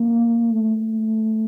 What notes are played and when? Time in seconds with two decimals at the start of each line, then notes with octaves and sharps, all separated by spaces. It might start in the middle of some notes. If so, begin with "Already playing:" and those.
Already playing: A#3
0.52 A3